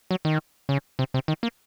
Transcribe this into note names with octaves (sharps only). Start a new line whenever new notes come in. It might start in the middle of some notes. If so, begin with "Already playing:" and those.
F#3
D#3
C#3
C3
C3
D#3
A#3